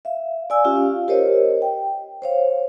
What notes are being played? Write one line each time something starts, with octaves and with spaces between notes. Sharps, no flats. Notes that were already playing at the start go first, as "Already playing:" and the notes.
E5 F5
D5 F5 G#5 E6
C#4 F4 G4 F5
G4 A#4 C5 C#5 D#5
G5
C5 C#5 F5